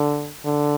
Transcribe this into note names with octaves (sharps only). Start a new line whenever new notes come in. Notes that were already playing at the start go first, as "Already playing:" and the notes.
Already playing: D3
D3